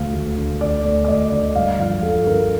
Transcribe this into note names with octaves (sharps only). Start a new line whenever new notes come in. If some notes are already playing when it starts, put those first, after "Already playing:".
Already playing: D2 A3 F5
D2
D3
D2 D5
A3
D5
D2 D#5
D3
G2 F5
F3 F5
G2 A4
D3 A#4